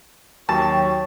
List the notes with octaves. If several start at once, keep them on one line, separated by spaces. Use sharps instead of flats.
D#2 F#3 C#5 G5 A5 C#6